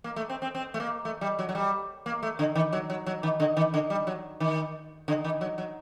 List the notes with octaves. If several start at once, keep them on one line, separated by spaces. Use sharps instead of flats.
A#3
A3
C4
C4
C4
A3
A#3
A3
G3
F#3
F#3
G3
A#3
A3
D3
D#3
F#3
F#3
F#3
D#3
D3
D#3
D3
G3
F#3
D#3
D3
D#3
F#3
F#3